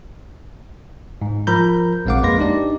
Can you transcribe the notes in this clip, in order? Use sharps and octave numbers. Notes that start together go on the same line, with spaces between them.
G#2
F3 A#4 A#5 B5 G6
A#1 G#3 C4 F5 F#5 D6
F2 G#3 A#3 B4 C6 A#6
D4 D#4 G4 D5